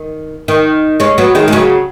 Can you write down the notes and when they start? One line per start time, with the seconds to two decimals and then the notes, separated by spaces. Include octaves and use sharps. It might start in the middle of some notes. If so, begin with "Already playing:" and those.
Already playing: D#3
0.48 D#3
1.00 G#3 C#4
1.18 F#3 B3
1.35 D#3 G#3
1.48 G#3
1.53 C#3 F#3